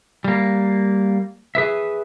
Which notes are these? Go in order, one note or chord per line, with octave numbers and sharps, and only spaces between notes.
G3 A#3
G#4 B4 E5